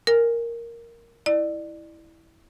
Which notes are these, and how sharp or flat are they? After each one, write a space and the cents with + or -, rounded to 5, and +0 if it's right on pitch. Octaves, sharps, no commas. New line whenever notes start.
A#4 +0 G#5 -20
E4 -10 D5 +30